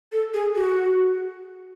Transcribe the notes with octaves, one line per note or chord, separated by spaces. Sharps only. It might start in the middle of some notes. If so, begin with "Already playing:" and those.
A4
G#4
F#4